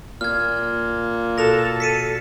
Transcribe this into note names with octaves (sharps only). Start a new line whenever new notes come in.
A#2 F6 G#6
B2 F#4 A4 A#6 F7
B6 C#7 D#7